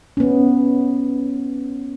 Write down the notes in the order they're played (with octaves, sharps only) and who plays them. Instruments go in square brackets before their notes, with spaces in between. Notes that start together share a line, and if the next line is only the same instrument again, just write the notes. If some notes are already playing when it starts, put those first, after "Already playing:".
[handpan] B3 C#4